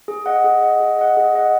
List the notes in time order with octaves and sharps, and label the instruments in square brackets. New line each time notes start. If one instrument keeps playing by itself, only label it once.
[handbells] G#4
D#5 F#5
G#4
D#5 F#5
G#4
D#5 F#5
G#4
D#5 F#5